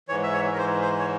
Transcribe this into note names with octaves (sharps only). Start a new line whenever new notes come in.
G#2 E3 C#5
E5
C#5
A#4
C5
C5
C#5